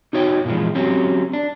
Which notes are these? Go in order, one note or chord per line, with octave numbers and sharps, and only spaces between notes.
D#4 F#4 C#5 F5 G5
A#2 D3 E3 F3 G#3
F#3 C4 C#4 G4
D4